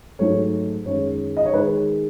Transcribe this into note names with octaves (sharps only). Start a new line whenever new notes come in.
G#2 F#3 A3 C#5
F#2 D#3 G#3 C#5
D#5
C#5
D#3 G#3 B4